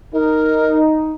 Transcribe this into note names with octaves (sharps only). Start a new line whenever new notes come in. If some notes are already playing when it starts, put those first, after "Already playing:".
D#4 A#4